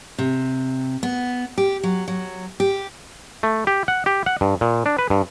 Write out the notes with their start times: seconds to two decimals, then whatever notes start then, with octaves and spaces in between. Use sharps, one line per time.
0.18 C3
1.03 B3
1.58 G4
1.83 F#3
2.08 F#3
2.60 G4
3.43 A3
3.67 G4
3.88 F#5
4.06 G4
4.26 F#5
4.41 G2
4.61 A#2
4.86 D4
4.98 B4
5.10 G2